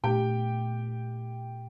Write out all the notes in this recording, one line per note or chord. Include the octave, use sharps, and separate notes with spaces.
A#2 A3 D4 G4 G5